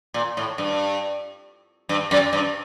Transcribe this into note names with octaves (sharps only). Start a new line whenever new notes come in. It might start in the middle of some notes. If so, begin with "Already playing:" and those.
A#2
A2
G2
G2
F#2
G2